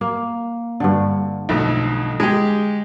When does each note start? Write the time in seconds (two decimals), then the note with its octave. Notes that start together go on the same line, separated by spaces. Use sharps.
0.01 A#3
0.80 G2 D3
1.49 B1 F2 A3
2.20 G#3 G4 G#4